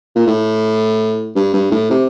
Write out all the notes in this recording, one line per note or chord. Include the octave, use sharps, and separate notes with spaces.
A#2
A2
G2
G2
A2
C3